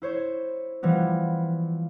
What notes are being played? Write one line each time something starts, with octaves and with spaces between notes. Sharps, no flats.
E4 C5 C#5
E3 F3 G3 B3